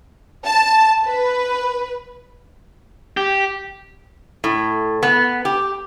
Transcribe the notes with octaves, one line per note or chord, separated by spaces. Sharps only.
A5
B4
G4
A2
B3
G4